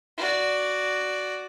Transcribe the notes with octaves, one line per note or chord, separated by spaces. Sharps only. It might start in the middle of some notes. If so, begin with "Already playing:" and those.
F#4 D5